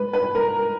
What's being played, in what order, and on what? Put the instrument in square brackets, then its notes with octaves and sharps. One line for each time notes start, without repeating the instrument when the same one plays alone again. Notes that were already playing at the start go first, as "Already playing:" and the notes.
Already playing: [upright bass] G#3 [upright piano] B4
[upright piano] B4
A#4